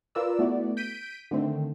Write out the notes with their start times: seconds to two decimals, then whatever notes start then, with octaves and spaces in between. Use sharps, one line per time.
0.15 F4 A#4 B4 D5 E6
0.39 A3 B3 E4 F#4 D5
0.77 G6 B6 D7 D#7
1.31 D3 D#3 A3 C4